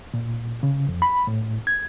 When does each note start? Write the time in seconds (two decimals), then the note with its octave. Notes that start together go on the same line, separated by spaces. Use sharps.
0.14 A#2
0.63 C#3
0.89 F2
1.02 B5
1.27 A2
1.67 G#6